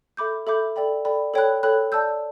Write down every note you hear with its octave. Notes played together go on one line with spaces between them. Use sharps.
A4 E5 B5 D6 G6
A4 E5 B5 D6 G6
A4 D5 G5 B5
A4 D5 G5 B5
A4 C#5 G5 B5 F#6
A4 C#5 G5 B5 F#6
D5 A5 E6 G6